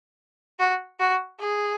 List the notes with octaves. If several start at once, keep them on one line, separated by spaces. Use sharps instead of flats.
F#4
F#4
G#4